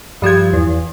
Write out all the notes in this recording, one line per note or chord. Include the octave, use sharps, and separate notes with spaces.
G2 F3 G4 G#6
E2